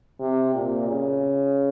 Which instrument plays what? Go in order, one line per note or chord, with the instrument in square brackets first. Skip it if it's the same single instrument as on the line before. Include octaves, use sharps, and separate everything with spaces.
[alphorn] C3
A#2
C#3